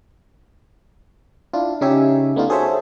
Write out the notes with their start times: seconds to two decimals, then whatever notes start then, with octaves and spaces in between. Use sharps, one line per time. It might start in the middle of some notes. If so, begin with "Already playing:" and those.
1.53 D4 E4 F4
1.81 C#3 C#4 D#4 G4 E5 G#5
2.36 A3 B3 D4 D#4 F4
2.49 F#4 G#4 A4 C5 C#5 E5